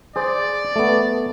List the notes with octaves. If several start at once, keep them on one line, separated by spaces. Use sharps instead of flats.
G#4 C5 D5
A3 B3